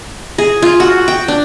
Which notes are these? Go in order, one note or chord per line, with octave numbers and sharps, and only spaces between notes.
G#4
F4
F#4
G5
D4